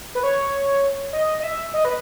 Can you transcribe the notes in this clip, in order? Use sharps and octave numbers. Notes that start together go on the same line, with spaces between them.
B4
C#5
D#5
D#5
E5
D#5
B4